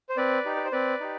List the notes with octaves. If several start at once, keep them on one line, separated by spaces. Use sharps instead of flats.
C5
C4 B4 D5
D#4 G4
B4
C5
C4 B4 D5
D#4 G4